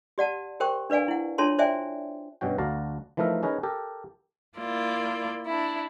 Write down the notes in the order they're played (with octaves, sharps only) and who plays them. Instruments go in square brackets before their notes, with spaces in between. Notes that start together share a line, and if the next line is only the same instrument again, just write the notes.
[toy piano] G4 D5 F#5 A5
G4 A#4 C5 G5 C#6
D4 B4 D5 F5 G#5
E4 F#5
D4 F4 A4 C#5 A5 C6
C5 D5 E5 G5 G#5
[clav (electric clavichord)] G2 B2 C#4 F#4 G5
D2 D4 F#4 F5 A5 A#5
E3 F3 A3 D#4 A#4 E5
C#4 D#4 G#4 A#4 B4 C#5
G4 A4 A#4
[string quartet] A#3 E4 F4 D5
D4 E4